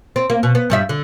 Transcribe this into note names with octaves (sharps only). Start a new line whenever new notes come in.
C4
A#3
B2
B3
G2 G3 E5
D3